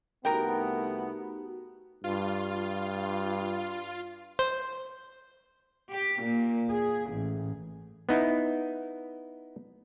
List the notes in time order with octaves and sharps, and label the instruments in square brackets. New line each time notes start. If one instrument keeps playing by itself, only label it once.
[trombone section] C2 A3 B3 [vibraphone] D#4 F#4 G4 [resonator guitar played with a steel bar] A#4 G5
[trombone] G2 [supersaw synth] F4
[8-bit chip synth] C5
[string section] G4
A#2
G#4
A1
[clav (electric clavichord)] B3 D#4 E4